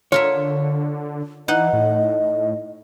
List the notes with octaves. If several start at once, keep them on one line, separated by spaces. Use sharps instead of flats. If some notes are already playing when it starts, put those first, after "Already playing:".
D3 F4 A#4 C#5 E5
E3 D#4 D#5 F#5
A2